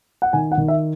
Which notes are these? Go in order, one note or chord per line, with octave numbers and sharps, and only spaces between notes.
F#5
D#3 G#5
F#5
D#3
E5